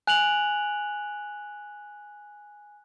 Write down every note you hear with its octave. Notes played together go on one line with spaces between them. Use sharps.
G#5 F#6 F7 F#7